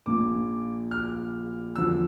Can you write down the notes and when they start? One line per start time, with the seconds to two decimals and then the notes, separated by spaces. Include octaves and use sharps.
0.06 A#1 A#2 F3 D6
0.91 F6
1.76 E2 D3 F3 E6